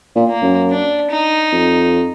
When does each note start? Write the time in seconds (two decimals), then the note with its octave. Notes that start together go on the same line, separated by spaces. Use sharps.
0.16 A#2
0.29 A#3
0.42 F#2
0.71 D4
1.11 D#4
1.53 F2